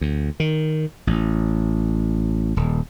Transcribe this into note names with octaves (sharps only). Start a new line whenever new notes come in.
D2
D#3
A1
D#1